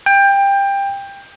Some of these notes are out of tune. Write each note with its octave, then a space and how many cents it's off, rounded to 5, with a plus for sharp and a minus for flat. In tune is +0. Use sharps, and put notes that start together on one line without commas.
G5 +20